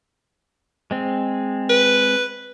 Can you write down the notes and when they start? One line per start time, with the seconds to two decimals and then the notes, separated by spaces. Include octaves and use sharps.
0.91 G#3 C4
1.69 B4